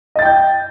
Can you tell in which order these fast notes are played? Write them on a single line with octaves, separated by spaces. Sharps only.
D#5 A6 G5 G6